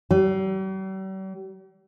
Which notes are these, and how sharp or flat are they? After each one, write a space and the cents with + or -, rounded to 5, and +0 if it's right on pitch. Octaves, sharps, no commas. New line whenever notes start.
G3 -45